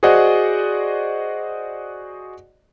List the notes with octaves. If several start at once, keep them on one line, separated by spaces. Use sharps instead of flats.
F#4 G#4 C5 D5 D#5 F#5